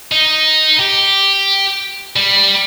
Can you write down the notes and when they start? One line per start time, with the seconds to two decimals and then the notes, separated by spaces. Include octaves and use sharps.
0.12 D#4
0.79 G4
2.16 G3